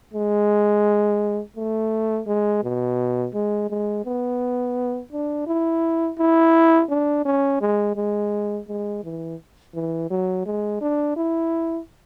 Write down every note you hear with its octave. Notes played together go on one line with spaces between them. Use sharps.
G#3
A3
G#3
B2
G#3
G#3
B3
D4
E4
E4
D4
C#4
G#3
G#3
G#3
E3
E3
F#3
G#3
D4
E4